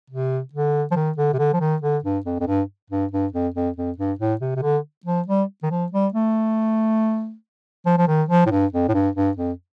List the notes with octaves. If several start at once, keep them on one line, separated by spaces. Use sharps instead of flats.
C3
D3
F3
D#3
D3
C3
D3
F3
D#3
D3
G2
F2
F2
G2
G2
G2
F2
F2
F2
G2
A2
C3
C3
D3
F3
G3
D#3
F3
G3
A3
F3
F3
D#3
F3
A2
G2
F2
A2
G2
G2
F2